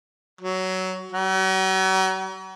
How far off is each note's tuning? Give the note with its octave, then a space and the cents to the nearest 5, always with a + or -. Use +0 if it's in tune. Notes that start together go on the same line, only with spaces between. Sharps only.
F#3 +15
F#3 +40